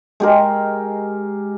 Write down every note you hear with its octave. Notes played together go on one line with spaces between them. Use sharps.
G#3 G4 A#4